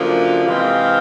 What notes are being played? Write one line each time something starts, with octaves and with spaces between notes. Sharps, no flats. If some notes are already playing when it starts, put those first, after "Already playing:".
Already playing: F#2 D3 F3 A#3
C3 E3 G#3 C4 F5